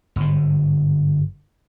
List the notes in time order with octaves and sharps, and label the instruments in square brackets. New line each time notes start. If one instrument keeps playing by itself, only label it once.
[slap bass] G1 G#2